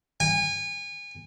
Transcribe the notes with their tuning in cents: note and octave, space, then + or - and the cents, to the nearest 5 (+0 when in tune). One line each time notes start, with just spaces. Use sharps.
G#5 -30